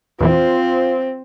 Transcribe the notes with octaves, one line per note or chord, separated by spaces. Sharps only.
E2 A#2 E3 F3 C4 F4